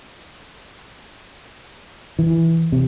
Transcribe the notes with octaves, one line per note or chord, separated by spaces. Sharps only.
E3
C3